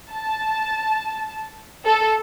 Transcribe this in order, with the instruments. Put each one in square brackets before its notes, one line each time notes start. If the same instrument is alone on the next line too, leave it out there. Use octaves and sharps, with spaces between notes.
[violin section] A5
A4